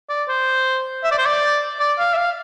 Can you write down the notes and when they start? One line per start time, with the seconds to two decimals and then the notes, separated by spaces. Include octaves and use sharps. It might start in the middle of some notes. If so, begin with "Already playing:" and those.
0.10 D5
0.29 C5
1.04 E5
1.12 D5
1.18 C5
1.26 D5
1.80 D5
1.99 F5
2.14 E5
2.17 F5